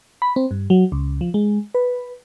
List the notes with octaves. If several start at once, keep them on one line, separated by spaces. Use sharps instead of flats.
B5
C4
G2
F#3
C#2
F3
G#3
B4